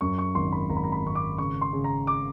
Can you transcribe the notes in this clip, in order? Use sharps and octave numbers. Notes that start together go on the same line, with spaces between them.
F#2 C#6
C#6
G#1 C6
B5
G#1 A#5
B5
A#5
B5
G#1 C#6
D6
C#3 C#6
C6
C#3
A#5
D6